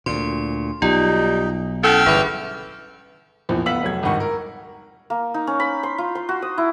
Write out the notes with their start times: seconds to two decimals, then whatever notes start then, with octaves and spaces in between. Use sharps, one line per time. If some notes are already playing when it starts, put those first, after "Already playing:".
0.06 D2 A#2 C6
0.82 B1 G3 D#4 F4
1.83 C#4 E4 A4 F#5 G5 E6 F6
2.06 G1 E3 G#4 B5
3.49 A#1 E2 F3
3.66 D1 B3 F5 E6 B6 F#7
3.83 F1 F#3 G#6
4.03 G#1 C#2 G2 F#5 C#6
4.20 A#4
5.10 A#3
5.34 D#4
5.47 C#4
5.60 B5
5.83 C6
5.98 F4
6.15 C6
6.29 F#4
6.42 D#6
6.58 E4